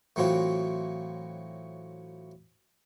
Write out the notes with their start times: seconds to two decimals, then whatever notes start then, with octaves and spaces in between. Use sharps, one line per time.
0.16 A2 E3 F#3 C4 F4 F#4